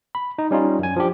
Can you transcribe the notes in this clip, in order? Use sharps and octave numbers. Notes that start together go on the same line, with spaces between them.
B5
D#4
G3 C#4 D#4 F4
F#2 G#5
F3 D4 G4